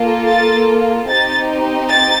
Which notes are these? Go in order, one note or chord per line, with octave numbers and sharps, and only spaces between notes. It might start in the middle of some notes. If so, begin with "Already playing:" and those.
Already playing: A#3 F4 A4
A6
C4 D#4 G4 A6
A6